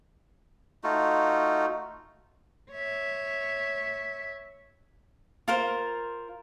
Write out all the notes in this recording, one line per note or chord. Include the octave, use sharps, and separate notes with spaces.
A3 D#4 F4 F#4
C#5 E5
F4 A#4 C5